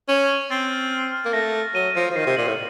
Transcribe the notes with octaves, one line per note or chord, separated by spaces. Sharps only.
C#4 F#7
D#7
C4 A6
F6
F6
F6
A#3
A3 A#6
A#6
F#3 D#7
F3 A#6
F3
D#3 C7
C3
A#2 F#7
A2